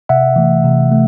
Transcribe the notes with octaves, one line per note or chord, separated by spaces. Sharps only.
C3 E5 F#5
E3 A3
C3
A3